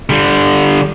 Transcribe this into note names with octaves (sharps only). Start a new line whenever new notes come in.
D3 G3